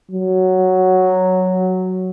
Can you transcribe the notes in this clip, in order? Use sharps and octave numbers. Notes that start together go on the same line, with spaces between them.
F#3